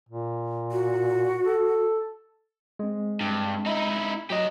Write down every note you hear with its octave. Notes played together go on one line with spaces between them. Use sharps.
A#2
F#4
A4
G#3 C4
G2
D#4 E4
F#3 G4 D#5 A#5